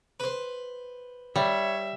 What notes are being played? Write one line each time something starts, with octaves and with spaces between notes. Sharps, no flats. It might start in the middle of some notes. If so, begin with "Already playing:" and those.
B4 C5
G3 C#5 E5